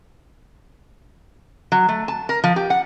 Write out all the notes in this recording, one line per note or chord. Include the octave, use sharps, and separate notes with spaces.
F#3
A3
A5
A#4
F3
G4
F#5